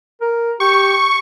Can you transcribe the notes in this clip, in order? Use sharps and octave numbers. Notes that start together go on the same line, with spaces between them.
A#4
G4 C#6